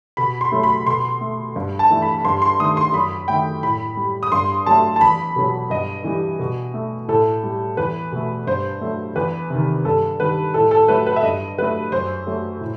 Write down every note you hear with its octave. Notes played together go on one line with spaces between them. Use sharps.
B2 B5
C6
F#3 A3
B5
B2 C6
A3
G2
A5
E3 A3
B5
G2 C6
C6
D#3 A3 D#6
C6
F#2 B5
D#3 A3 G5
A2 B5
G3
D#6
G2 C6
F#3 A3 A5
A5
E2 B5
B2 F#3
G2 D#5
E3 G3
B2
A3
A2 A4
G3
E2 B4
B2 A3
G2 C5
F#3 A3
E2 B4
C3 D#3
G2 A4
D#3 G3 B4
A2 A4
A4
F#3 A3 B4
B4
E5
G2 D#5
F#3 A3 B4
F#2 C5
F#3 A3
A2